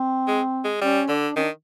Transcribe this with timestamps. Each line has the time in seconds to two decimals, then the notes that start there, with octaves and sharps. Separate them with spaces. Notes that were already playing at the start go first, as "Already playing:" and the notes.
Already playing: C4
0.28 G#3
0.64 G#3
0.81 G3 C#4
1.08 D3 D4
1.36 D#3 C#4
1.43 D4